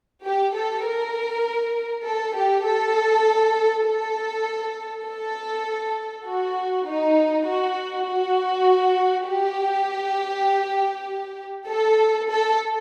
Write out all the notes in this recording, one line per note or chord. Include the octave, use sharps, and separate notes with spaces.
G4
A4
A#4
A4
G4
A4
A4
A4
F#4
D#4
F#4
F#4
G4
A4
A4